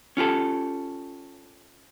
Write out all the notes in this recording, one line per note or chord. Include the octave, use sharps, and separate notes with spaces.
C#4 F4 G4 A4